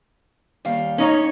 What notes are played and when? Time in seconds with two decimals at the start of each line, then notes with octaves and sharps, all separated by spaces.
0.65 D#2 G3 F5
0.98 C#4 D#4 C#5